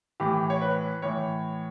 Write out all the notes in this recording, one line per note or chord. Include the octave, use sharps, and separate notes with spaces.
A2 E3 G4
C#5
B4
A2 E3 C#5